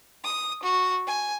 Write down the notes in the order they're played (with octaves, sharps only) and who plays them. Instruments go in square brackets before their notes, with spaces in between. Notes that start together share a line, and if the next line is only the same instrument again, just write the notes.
[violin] D#6
F#4
G#5